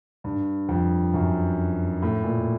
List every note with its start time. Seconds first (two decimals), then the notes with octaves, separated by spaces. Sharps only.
0.24 G2
0.69 F2
1.14 F#2
2.02 A2
2.24 A#2